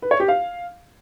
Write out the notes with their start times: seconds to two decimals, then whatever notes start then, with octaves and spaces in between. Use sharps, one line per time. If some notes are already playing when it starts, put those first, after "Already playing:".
0.02 B4
0.11 C#5
0.20 G4
0.28 F5